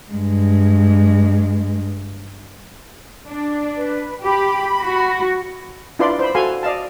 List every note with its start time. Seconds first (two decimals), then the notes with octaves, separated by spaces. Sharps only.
0.11 G2 G#3
3.28 D4
3.75 B4
4.23 G4 B5
4.83 F#4
5.99 D4 E4 F4 B4 D5 C6
6.19 C5 B5
6.35 F#4 A4 F5 G#5 C6
6.63 D5 D#5 F5 A5